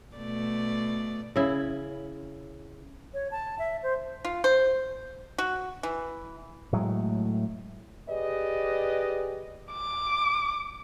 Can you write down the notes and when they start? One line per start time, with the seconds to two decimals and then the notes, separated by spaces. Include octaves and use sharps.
0.16 B2 A3 D5
1.36 C#3 E4
3.14 C#5
3.31 A5
3.59 E5
3.83 C5
4.25 F4
4.44 C5
5.38 F#4
5.83 E3
6.72 A2 F#3 G#3 A3
8.09 G4 G#4 B4 D5 D#5
9.72 D6